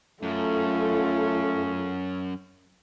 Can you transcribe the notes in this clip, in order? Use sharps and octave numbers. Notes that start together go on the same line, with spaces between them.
F#2 A3 C#4 F4 A4